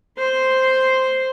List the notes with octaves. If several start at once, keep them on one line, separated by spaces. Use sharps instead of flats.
C5 C6